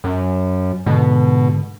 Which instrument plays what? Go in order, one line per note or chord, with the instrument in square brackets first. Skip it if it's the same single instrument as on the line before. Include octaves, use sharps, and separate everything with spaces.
[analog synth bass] F#2
[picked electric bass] G#2 D3 [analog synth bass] B2